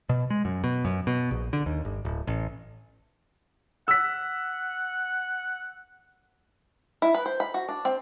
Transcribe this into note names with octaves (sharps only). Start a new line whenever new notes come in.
B2
G#3
F#2
B2
F#2
B2
A#1
D3
D#2
G1
D1
A1
F#5 E6 B6
E4
B4
C5
B5
F#4
D4
C4